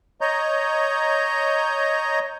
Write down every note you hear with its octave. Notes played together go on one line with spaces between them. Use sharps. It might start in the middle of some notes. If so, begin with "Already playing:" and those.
C#5 D#5 A#5 G6